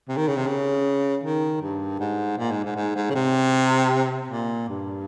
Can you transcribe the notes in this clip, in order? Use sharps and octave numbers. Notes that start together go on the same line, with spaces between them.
C3
D#3
C#3
C3
C#3
D#3
G2
G#2
A#2
G#2
G#2
G#2
G#2
C#3
C3
A#2
G2